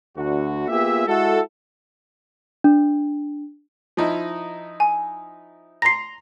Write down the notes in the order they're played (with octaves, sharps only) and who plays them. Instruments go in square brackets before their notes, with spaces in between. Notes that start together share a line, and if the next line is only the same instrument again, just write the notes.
[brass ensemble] D2 F#4
A#3 B3 F4 G4 G#4 E5
G#3 E4 F#4 A4
[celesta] D4
[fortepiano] F3 D#4 E4
[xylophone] G#5
[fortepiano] A#5 C6 [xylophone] A#6 C7